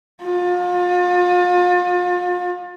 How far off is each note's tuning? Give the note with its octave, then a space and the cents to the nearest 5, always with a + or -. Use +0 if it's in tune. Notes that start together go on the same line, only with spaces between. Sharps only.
F4 +35